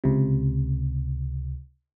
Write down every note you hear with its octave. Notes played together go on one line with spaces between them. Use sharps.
C#2 C3